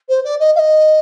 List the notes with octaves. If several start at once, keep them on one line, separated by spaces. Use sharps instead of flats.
C5
D5
D#5
F5
D#5